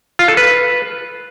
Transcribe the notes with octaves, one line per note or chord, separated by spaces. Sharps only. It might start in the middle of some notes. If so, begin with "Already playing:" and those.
F4
A4
B4